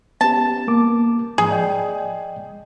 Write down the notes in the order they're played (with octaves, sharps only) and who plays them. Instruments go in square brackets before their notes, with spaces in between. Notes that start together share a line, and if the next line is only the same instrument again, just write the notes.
[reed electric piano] B3 C#4 G4 [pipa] A5
[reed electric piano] A#3 D6
[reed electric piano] G#2 F3 [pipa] G#4
[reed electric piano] D5 D#5 G5